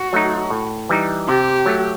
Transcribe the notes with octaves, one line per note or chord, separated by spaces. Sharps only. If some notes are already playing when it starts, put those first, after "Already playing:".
Already playing: F#4
F#3 A3 D#4
A2
E3 G3 D#4
C3 G4
F#3 A3